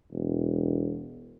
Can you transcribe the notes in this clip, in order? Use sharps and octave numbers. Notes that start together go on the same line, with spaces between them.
E1